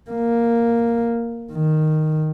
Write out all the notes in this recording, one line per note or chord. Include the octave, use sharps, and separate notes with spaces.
A#3
D#3